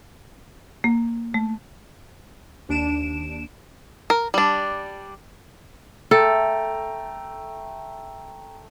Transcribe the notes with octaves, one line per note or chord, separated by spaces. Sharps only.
A#3
A3
D#2 D4 D7 E7
A#4
G3 D4
A3 A4 G5 A#5